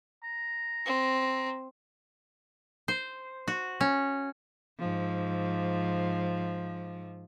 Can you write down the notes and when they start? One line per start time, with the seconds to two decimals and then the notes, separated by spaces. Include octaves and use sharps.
0.24 A#5
0.86 C4
2.88 C5
3.48 F#4
3.81 C#4
4.79 G#2 F3